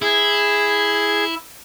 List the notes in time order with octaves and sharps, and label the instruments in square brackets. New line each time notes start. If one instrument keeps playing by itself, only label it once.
[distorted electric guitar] E4 [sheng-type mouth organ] G#4